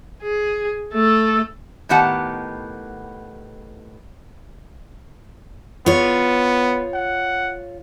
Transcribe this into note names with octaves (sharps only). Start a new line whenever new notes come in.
G#4
A3 A4
A2 D#3 B3 G4 F#5 A5
B3 F4 C#5
F#5